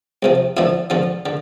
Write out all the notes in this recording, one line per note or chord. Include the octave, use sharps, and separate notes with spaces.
C2 C3 F3
F2 D3 F3 E4
F2 D3 F3
D3